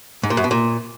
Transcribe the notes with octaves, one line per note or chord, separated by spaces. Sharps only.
G#2
A#2
F#2
B2
A#2